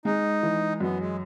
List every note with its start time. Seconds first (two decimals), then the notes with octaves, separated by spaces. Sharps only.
0.05 G#3 D#4
0.43 E3
0.81 F#2 B3
1.00 G#3